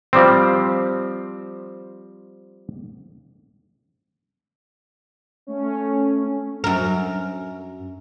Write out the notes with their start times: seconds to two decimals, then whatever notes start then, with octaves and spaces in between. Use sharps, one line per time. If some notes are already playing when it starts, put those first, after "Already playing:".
0.13 F3 G3 C4
5.47 A3 C#4
6.64 F#2 A#4